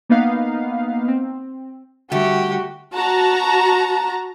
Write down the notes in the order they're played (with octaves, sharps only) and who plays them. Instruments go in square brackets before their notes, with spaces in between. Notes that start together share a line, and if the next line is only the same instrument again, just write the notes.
[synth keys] A#3 B3 D#4 B4 F5
C4
[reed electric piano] D3 G3 [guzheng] A3 [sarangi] F#4 [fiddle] G4
[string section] F#4 A5 A#5